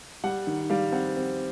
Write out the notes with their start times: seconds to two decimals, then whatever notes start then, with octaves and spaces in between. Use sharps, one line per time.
0.24 G3 F#5
0.47 D#3
0.70 G3 F5
0.92 C4 F#5
1.16 C4